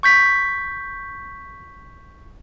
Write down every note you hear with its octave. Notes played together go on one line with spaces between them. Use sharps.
C#6 G6 B6